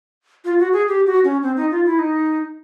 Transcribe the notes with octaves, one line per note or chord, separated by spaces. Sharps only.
F4
F#4
G#4
G4
F#4
C#4
C4
D#4
F4
E4
D#4